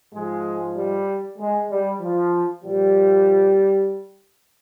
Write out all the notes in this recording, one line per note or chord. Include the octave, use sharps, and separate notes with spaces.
G#2 F3 G#3
G3
G#3
G3
F3
A#2 F3 G3